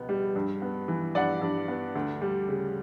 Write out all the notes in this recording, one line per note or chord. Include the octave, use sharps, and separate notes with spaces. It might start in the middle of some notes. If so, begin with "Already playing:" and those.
Already playing: C#2 B2 B3
G3
G2
B3
E3
G2 D5 F#5
G2
B3
D2
G3
C#3